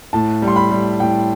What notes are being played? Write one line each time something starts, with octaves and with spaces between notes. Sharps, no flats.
A2 A5
G3
C6
B5
G3
A2 G5